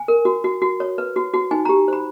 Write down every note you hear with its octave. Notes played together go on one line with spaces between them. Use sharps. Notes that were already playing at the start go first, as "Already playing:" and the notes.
Already playing: G#5
A#4
F#4
F#4
F#4
C#5
B4
F#4
F#4
D#4 G#5
G4 A#5
C5 B5